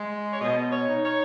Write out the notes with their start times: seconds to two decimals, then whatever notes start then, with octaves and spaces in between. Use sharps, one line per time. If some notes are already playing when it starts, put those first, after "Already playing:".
Already playing: G#3
0.33 C#5
0.41 B2 D#5
0.72 C#5
0.88 D#4
1.05 C#5